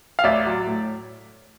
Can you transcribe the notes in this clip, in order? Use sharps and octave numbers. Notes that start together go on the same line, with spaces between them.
F5
A1 D5 E5
F#3
A2